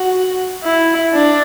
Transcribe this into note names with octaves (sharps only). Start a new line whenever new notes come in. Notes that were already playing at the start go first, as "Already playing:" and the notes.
Already playing: F#4
E4
D4